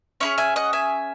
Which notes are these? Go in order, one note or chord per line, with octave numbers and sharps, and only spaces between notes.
C#4 E4 G#4 C#5 E5
E5 G#5
D#5 F#5
E5 G#5